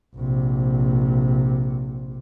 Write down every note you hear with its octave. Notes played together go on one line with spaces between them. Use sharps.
A#1 C3